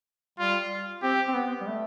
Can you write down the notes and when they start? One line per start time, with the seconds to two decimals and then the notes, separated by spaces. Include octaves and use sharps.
0.39 G3 F4
1.02 C4 G4
1.28 C4
1.34 B3
1.61 G3
1.67 A3